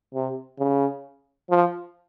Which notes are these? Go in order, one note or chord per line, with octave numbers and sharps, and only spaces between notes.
C3
C#3
F3